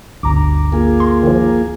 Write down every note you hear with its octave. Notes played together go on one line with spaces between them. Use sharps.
G1 D2 A#5 D6
A#3 F4 G#4
C6
D#3 F3